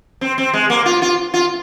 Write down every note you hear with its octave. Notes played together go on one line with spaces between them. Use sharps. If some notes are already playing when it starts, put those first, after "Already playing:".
C4
C4
G#3
A#3
F4
F4
F4